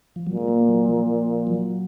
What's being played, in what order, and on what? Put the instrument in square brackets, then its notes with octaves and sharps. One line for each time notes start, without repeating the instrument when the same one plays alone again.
[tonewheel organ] F3
[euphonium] A#2 [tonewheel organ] F#3
[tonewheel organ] G#3
A#3
F#3
F3
F#3